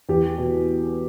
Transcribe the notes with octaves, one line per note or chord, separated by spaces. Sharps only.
E2 G4
B2